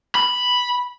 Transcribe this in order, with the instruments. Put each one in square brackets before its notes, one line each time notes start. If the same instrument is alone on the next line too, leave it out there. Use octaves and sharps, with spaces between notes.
[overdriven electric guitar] B5